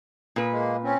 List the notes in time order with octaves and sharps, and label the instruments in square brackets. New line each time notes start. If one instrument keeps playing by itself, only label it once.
[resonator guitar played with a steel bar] A#2 B4
[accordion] G#3 A#3
C4 C#4